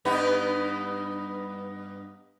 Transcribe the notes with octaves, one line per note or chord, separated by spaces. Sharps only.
G2 B3 D#4